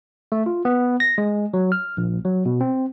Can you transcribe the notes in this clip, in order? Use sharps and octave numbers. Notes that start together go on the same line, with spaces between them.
A3
F4
B3
A#6
G#3
F#3
F6
A#1
F#3
B2
C4